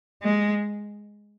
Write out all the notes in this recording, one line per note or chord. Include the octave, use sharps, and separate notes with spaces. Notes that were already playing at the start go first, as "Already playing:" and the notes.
G#3